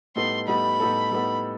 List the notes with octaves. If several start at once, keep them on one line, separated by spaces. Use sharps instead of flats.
A2 G3 B3 D#4 A4 C6
A2 G3 B3 D#4 A4 B5
A2 G3 B3 D#4 A4
A2 G3 B3 D#4 A4